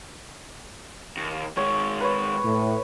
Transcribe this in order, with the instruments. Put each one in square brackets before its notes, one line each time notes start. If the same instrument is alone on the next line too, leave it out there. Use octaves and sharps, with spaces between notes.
[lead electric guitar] D#2
[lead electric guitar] D#3 G#3 [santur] C#5
[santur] B4 C#5
[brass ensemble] A2